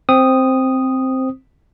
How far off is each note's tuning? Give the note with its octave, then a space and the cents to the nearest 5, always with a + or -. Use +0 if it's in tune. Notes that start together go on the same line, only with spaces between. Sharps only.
C4 +0 C5 +0 D#6 -5